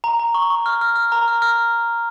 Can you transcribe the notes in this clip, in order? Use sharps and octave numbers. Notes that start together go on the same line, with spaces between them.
A#5
A#5
C#6
C#6
F6
F6
F6
A#5
F6
F6